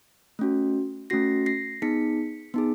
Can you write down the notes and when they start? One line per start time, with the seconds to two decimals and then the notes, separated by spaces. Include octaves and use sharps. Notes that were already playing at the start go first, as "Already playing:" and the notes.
0.39 A3 C#4 F#4
1.10 A3 C#4 F#4 A#6 C7
1.46 A#6 C7
1.82 B3 D#4 G#4 B6 C#7
2.54 B3 D#4 G#4